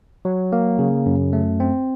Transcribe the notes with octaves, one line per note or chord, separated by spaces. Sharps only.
F#3
A#3
C#3
F#2
A3
C4